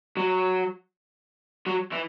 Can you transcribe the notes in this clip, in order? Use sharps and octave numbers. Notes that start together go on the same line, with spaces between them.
F#3
F#3
E3